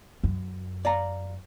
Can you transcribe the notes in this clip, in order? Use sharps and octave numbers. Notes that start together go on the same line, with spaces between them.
F#2
D5 F5 A#5